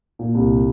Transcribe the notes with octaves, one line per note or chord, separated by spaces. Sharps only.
A#2
C2